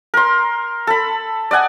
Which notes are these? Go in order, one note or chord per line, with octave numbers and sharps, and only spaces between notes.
A#4 C6
A4 B5
D5 D#5 F#5 G#5